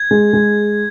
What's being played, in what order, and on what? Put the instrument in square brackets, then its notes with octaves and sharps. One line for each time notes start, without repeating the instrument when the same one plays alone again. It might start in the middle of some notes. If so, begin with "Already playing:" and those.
Already playing: [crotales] G#6
[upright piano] G#3
G#3